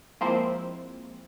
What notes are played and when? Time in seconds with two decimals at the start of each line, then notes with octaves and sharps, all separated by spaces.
0.21 F3 G#3 A#3 C4 E4 C5